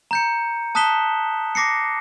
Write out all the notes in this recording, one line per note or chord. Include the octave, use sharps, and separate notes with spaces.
A#5 G6 C#7
A5 D#6 F#6 B6 E7 G7
D6 A#6 C7 C#7